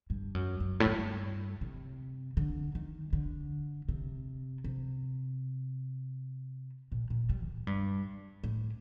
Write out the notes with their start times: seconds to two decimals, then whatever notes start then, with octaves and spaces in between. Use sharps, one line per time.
0.10 G2
0.34 F#2
0.60 F#2
0.80 A2
0.86 G2
1.61 C3
2.37 D3
2.75 D#3
3.13 D3
3.89 C3
4.64 C3
6.92 A#2
7.10 A#2
7.30 G3
7.48 A2
7.67 G2
8.44 A2